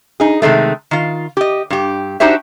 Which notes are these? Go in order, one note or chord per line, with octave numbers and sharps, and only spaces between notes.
D#4 G#4
C3 D#3 G#3 A3
D#3 F4
G4 D#5
G2 G4
D4 D#4 F#4 G4 C5 E5